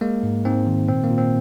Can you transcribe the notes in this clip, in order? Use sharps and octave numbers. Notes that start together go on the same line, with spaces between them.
G#3 A#3
G#2
G#2 C4
D#3
A#2 C4
A#3
A#2
C4